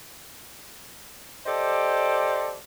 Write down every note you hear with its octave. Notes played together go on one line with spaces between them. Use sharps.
G4 A4 C5 D5 D#5